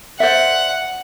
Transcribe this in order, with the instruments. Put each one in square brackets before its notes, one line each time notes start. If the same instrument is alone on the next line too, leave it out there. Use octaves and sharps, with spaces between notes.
[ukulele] C5 D5 E5 [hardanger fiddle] F#5